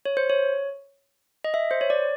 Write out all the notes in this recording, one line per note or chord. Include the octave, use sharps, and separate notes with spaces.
C#5
C5
C#5
D#5
E5
C5
C#5
D5